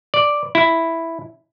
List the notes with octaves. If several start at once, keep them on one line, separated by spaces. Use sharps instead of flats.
D5
E4